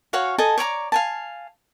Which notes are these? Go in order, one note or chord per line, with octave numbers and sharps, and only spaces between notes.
F#4 C#5 F5 G#5
A4 D#5 G#5 A5
C#5 D5 A#5 D6
F5 G#5 A5